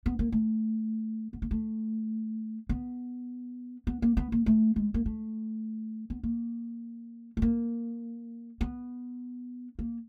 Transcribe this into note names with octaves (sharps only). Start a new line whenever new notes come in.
B3
A#3
A3
B3
A#3
A3
B3
B3
A#3
B3
A#3
A3
G#3
A#3
A3
B3
A#3
A3
A#3
B3
A#3